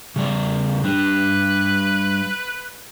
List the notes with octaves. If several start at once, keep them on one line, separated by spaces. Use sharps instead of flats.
C#3 G3 D5
G3 D4 B4